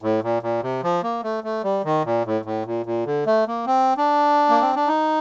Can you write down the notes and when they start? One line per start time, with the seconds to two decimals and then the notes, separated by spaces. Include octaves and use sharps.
0.02 A2
0.23 A#2
0.43 A#2
0.63 C3
0.83 F3
1.03 A#3
1.23 A3
1.44 A3
1.64 G3
1.84 D#3
2.05 A#2
2.25 A2
2.45 A2
2.66 A#2
2.86 A#2
3.06 D3
3.26 A3
3.47 A#3
3.66 C4
3.97 D4
4.49 A#3
4.61 C4
4.76 D4
4.88 D#4